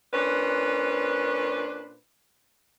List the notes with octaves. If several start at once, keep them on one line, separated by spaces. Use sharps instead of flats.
A#2 C#4 D4 B4 C5